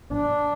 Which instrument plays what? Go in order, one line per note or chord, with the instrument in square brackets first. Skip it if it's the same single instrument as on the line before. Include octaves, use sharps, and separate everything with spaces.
[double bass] D4